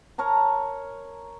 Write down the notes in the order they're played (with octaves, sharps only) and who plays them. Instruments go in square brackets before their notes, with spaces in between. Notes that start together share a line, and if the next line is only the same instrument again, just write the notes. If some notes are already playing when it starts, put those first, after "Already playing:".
[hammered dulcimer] A#4 C#5 A5 A#5